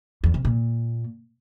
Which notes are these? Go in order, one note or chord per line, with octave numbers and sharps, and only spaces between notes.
E2
C3
A#2